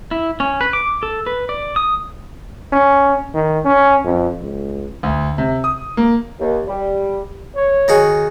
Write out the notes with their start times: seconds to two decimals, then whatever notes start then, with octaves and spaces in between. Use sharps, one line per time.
0.11 E4
0.40 C#4
0.61 B4
0.73 D6
1.03 A4
1.26 B4
1.49 D5
1.76 D#6
2.73 C#4
3.34 D#3
3.65 C#4
4.04 F2
4.41 C#2
5.03 D2
5.38 C3
5.64 D#6
5.97 A#3
6.40 D#2
6.68 G3
7.55 C#5
7.88 D#3 F#4 G#4